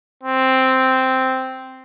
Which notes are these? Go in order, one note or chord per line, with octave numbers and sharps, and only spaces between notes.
C4